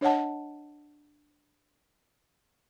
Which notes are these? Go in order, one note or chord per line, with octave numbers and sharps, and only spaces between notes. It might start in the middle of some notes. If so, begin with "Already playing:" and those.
D4 C#5 D#5 F#5 A5